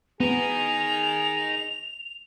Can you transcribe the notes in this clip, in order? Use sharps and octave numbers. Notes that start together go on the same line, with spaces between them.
B3 D#4 G#4 A#4 F7